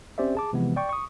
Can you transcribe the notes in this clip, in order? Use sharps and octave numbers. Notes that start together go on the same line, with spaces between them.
C4 C#4 G4 C5 D5 E5
G#4 A5 D6
C3 E3 F3 G#3 B3
D5 G5 C#6
C#6 D#6